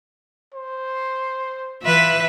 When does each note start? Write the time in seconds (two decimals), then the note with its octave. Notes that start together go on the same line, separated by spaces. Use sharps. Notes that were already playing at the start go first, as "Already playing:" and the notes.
0.54 C5
1.83 E3 F4 B4 E5